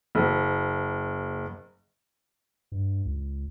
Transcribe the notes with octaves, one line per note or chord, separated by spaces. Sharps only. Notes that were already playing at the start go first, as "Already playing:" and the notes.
F#1
G2
C#2